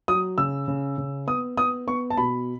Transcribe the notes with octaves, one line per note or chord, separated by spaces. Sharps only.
F#3 D#6
C#3 E6
C#3
C#3
B3 D#6
B3 D#6
B3 C#6
A5
B2 B5